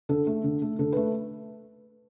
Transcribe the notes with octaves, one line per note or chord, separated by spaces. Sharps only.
D3 A4
A3
D3
A3
D3 A4
A3 B4